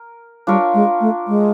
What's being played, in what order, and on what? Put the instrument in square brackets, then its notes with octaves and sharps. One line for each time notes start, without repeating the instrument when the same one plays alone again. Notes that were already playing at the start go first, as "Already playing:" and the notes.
Already playing: [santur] A#4
[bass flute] G3 [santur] D4 F4 A#4 C#5
[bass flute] G#3
A3
G#3